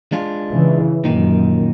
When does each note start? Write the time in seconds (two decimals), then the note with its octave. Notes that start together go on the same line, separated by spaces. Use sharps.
0.12 G#3 D4 F4
0.51 C#3 E3
1.05 F#2 A#2 D#3 D#4